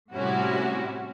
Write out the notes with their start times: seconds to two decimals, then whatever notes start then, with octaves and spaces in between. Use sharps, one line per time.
0.13 A2 C3 G3 C#4 E4 F#4